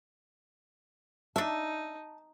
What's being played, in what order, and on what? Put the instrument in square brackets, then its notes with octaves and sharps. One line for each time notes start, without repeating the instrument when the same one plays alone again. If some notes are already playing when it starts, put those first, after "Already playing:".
[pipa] D4 E5 [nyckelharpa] D#4 [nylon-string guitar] A5